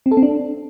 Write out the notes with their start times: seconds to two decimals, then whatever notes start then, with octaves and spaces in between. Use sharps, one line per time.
0.06 C4
0.11 A4
0.17 C4
0.23 D4